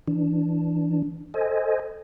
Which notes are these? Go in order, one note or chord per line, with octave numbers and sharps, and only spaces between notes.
E3 D4
A4 C5 D#5 G#5